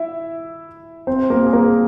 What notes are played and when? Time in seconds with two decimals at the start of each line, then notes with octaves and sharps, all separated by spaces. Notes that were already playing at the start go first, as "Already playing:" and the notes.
Already playing: E4 E5
1.07 C4 C5
1.30 A#3 A#4
1.46 G#4
1.53 A#3 A#4